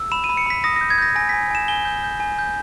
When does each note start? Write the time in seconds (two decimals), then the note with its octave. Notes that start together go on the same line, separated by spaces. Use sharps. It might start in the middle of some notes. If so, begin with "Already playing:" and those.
Already playing: E6
0.12 B5 E7
0.24 D#7
0.29 B5
0.37 C#7
0.46 B5 B6
0.64 D#6 A#6
0.76 A#6
0.81 G6
0.90 G#6
0.98 G6 A#6
1.16 G#5 A#6
1.29 B6
1.34 G#5
1.51 G#5 E7
1.68 G#5 G7
1.85 G6
2.04 G6
2.20 G#5
2.39 G6